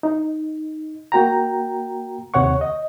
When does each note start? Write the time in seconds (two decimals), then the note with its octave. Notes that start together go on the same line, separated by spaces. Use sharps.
0.03 D#4
1.12 A#3 F#4 G5 A#5
2.34 D#2 C3 C#5 F#5 C#6
2.61 D#5